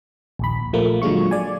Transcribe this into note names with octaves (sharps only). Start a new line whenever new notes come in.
A#1 D#2 B5
A#2 F3 A3 A#3
D3 F#3 G#3 F4 C#6
D5 G#5